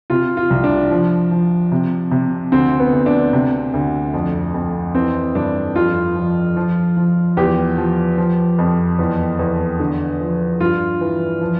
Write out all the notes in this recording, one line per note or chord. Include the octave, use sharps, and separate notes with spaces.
C3 F4
F4
C2
D4
F3
F3
C3
C3
D2 C4
B3
D2
D4
C3
D2
F2
F2
E3 C4
G2 D4
F2 F4
F3
F3
F3
E2 G4
F3
F3
F2
E2
E2
D3
F3
G2 F4
E3
F3